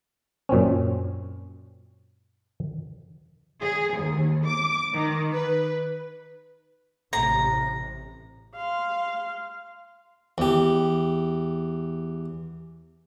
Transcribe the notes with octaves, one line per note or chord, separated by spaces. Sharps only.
F#2 A#2 C4 C#4
G#4
D#2
D6
D#3
B4
A1 C3 A#5
F5 C6
E2 G4